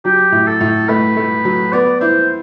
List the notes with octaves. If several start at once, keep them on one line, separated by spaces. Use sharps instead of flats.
F#3 G4
A2
A4
A2
A3 B4
A3
F#3
B3 D5
E4 C5